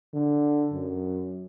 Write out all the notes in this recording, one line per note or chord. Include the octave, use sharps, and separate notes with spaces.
D3
F#2